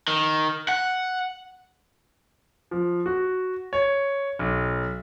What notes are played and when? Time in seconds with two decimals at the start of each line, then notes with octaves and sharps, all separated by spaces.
0.08 D#3
0.69 F#5
2.71 F3
3.06 F#4
3.73 C#5
4.39 B1